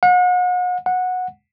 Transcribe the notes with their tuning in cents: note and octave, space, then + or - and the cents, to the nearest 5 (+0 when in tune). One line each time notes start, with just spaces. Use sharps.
F#5 -40
F#5 -15